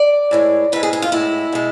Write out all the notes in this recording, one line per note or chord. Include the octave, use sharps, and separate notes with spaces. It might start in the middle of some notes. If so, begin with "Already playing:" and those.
Already playing: D5
A2 E3 G#3
G#2 E3 G#3 B4
G#4
G#4
F4
A2 G#3 E4
B2 G#3